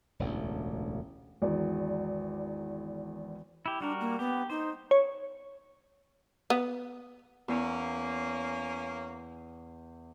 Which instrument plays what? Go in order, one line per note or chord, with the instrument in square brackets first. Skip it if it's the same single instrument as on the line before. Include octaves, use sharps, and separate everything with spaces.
[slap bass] E1 A1 D2
[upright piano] G#1 E2 D5
[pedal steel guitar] E4 G4
[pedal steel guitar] G3 F#4 A#4 [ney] D4
[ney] A#3
[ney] B3 [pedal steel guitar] G4
[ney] D#4 [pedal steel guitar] C5
[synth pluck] C#5
[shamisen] B3
[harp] E2 [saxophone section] A#3 C#4